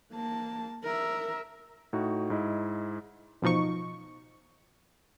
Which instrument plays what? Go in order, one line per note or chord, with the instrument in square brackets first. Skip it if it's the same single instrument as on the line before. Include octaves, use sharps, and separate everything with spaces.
[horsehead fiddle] A#3 A5
A#4 E5
[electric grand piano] A2 D#4 F#4
G#2 E4 D#5
[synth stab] A1 B2 F3 D#4 C#6